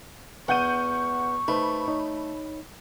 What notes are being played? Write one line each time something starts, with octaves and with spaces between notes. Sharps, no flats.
E2 F#5 C#6 G6 D#7
A3 D#4 B4 C5 B5
D#4 C#5